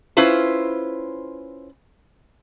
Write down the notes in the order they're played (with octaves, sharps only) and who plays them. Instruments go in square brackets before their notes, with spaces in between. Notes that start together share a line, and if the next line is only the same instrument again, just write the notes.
[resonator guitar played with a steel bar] C#4 E4 F4 B4 C5